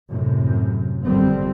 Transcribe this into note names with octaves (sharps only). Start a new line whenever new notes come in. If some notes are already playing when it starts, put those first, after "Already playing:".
F#2 A2 C3
G#1 F2 D3 G3 C4